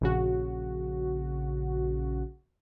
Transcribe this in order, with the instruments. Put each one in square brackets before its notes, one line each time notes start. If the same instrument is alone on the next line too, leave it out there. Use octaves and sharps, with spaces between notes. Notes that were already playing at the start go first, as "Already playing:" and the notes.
[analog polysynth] A#1 C#3 F#4